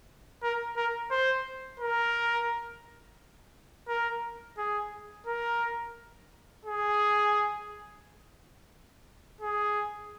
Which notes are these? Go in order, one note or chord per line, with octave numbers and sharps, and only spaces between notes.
A#4
A#4
C5
A#4
A#4
G#4
A#4
G#4
G#4